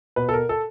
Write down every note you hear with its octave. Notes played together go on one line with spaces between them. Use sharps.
B2 B4
A4
A#4
A4